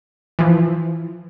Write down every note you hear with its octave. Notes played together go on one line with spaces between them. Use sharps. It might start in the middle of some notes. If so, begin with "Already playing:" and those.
E3 F3